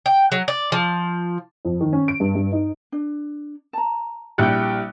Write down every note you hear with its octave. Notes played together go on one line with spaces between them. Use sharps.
G5
F#3
D5
F3
F2
D#3
C#4
D7
G2
G2
D#4
D4
A5 A#5
A#1 G3 E4 G5 F#6 C#7